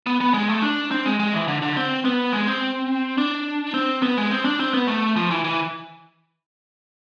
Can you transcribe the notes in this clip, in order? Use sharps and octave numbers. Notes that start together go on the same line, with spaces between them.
B3
B3
G#3
A3
D4
C4
G#3
G#3
E3
D3
D3
C4
B3
G#3
C4
D4
C4
B3
G#3
C4
D4
C4
B3
A3
F3
E3
E3